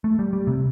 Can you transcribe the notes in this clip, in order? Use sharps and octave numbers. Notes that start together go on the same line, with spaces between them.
A3
G3
G3
C3